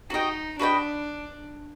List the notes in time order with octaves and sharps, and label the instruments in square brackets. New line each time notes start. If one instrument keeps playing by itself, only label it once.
[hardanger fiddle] D#4 [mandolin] F#4 B4 D#5 G5
[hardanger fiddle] D4 [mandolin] F#4 B4 D#5 G5